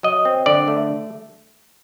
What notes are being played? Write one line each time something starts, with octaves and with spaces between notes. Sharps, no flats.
F#3 D#5
C4
D3 D5
A3